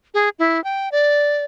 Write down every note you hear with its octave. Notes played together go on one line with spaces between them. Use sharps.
G#4
E4
G5
D5